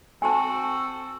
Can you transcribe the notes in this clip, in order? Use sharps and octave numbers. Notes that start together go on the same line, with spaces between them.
C4 F#4 A4 G#5 A5